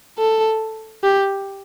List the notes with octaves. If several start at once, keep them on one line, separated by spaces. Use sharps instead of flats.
A4
G4